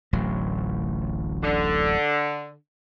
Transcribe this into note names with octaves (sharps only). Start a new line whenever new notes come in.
D1 A1 F#3
D3